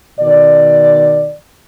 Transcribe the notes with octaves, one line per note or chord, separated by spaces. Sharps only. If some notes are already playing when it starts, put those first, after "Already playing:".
B2 D#3 D5